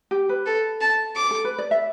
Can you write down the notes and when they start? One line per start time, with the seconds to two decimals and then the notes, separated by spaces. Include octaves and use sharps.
0.11 G4
0.29 B4
0.46 A4
0.81 A5
1.16 D6
1.31 A4
1.44 B4
1.58 D5
1.71 E5